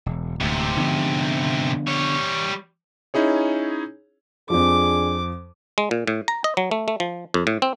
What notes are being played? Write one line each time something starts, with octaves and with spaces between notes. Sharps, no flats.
E1
D1 D2 G#2 C3
D3 F3 B3
G3 C#5
C#4 D#4 E4 G#4 C#5
F2 F3 D4 G#4 D6
G#3
A#2
A2
A#5
D#5
F#3
A3
A3
F3
F2
A2
C4